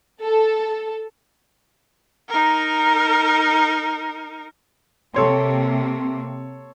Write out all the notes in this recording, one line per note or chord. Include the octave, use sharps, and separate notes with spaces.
A4
D#4 A#4
C3 A#3 C4 A4 C#5 C6